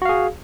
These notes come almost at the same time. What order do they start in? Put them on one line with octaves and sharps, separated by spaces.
F#4 F5 G#4